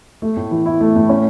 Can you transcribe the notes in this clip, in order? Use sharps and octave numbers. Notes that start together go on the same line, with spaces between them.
A3
A2
E3
E4
A3
A2
C#4